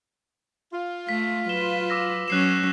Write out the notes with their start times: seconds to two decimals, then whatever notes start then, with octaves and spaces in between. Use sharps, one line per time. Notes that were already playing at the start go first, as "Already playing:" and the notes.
0.72 F4
1.09 A3 B6
1.49 F#3 B4 E7 G7
1.90 D6 E6 A#6
2.28 F#3 C#4 F#6 C7 E7